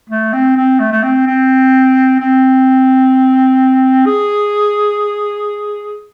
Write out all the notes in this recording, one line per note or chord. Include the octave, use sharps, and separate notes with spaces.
A3
C4
C4
A3
A3
C4
C4
C4
G#4